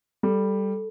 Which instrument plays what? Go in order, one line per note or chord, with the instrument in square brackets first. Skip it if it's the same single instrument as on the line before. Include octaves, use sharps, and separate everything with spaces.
[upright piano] G3 [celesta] A4